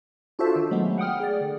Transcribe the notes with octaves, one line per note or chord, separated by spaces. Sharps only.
D4 F4 F#4 A4 C5 E5
D#3
F#3 G#3 A3 B3
F#5 G5 D#6 F6
G#4 D5
D3